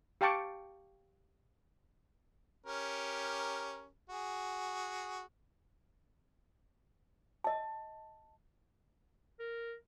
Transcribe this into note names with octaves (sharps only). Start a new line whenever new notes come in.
G4 F5 G5 A5 C#6 D6
C#4 G4 A#4
F#4 G#4
D#5 A5
A#4